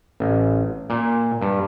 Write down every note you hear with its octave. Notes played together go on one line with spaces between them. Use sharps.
A1
A#2
G2